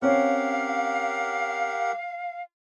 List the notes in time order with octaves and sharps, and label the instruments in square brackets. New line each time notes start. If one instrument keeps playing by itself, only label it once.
[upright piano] C4 C#4 [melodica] G4 A#4 F#5 [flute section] F5